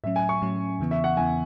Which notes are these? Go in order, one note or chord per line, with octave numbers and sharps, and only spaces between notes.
A2 F#3 C#4 E5
G#5
C#6
A2 F#3 C#4
E2 C#3 E3 B3
E5
F#5
E2 C#3 E3 B3 G#5